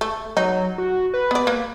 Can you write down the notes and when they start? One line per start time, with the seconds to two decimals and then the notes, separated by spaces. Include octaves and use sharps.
0.01 A3
0.37 F#3 D#4
0.78 F#4
1.14 B4
1.31 B3 D5
1.47 A#3